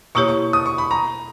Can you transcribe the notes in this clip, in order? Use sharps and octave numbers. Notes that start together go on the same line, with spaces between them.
B2 A#3 E4 G4 C#5 C#6
C#6
D#6
C#6
B5
A#5